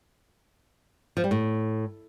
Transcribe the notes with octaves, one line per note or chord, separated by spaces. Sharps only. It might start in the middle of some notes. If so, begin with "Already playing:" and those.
F3
G3
A2